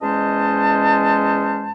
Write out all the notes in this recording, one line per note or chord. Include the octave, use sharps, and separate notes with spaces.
E2 G#3 C#4 C5 D#5 A5